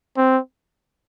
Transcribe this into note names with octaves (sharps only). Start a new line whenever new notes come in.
C4